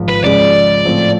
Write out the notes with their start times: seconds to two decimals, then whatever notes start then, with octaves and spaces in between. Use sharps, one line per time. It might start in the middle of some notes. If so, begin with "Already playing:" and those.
Already playing: G#1 G#2 F3
0.09 B4
0.24 C#2 C#3 F3 G#3 D5
0.85 A2 F3 A3 C4